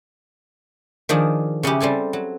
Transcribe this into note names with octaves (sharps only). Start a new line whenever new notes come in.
D#3 F3 D4 G#4
C#3 C#4 E4 G4
G3 C4 A4 G#5
F#3